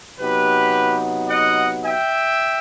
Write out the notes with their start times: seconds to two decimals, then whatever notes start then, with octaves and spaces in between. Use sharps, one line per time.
0.18 C3 F#3 B3 D#4 G4 B4
1.29 D#5 F#5
1.84 E5 G5